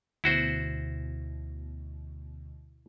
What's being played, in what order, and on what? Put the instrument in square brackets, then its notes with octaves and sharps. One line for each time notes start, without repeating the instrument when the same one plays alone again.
[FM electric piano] D2 B2 [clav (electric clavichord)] E4 F#4 C5